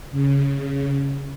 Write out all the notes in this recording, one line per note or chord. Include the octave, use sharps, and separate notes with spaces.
C#3